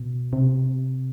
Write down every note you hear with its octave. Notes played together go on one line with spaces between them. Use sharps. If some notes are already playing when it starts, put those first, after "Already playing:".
Already playing: B2
C3